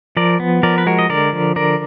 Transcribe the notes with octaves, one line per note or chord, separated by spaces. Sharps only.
F3 A#4 D5
B3
F3 A#4 D5
B4
G#3 F#4 A#4
D#5
D3 A#4 D5
F3
D3 A#4 D5